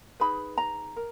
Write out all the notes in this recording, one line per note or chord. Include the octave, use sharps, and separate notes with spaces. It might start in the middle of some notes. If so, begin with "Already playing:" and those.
D#4 G#4 B4 B5
A#5
A#4